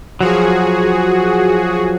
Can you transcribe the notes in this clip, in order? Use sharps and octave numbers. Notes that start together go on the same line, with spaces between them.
F3 F#3 F#4 G#4